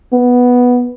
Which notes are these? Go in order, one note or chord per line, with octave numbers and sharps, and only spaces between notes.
B3